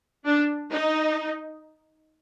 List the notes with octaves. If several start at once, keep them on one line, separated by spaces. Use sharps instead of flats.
D4
D#4